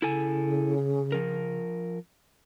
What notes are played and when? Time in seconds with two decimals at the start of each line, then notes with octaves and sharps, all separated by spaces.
0.02 C#3 E4 A4 G#5
1.12 F3 A#4